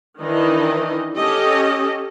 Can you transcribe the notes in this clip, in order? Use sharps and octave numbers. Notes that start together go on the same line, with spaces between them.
D#3 E3 D4 D#4 D#5
C#4 G4 A4 D#5